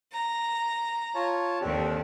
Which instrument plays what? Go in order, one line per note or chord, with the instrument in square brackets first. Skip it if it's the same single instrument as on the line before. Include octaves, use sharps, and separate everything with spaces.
[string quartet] A#5
[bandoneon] F4 C#5 A5
[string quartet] D#2 D3 [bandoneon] C4 D4 G4